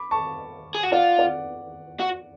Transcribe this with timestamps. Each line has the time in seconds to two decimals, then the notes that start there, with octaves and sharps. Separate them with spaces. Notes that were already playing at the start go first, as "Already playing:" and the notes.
Already playing: B5 D6
0.11 A5 C#6
0.75 G#4
0.83 F#4
0.92 F4 D5 F#5
1.18 D5 F#5
2.00 F#4